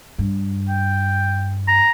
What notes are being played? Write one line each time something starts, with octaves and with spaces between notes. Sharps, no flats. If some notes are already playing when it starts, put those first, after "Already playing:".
G2
G5
A#5